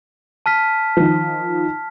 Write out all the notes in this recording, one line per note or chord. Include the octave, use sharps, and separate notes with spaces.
A5 F6 B6
D#3 F3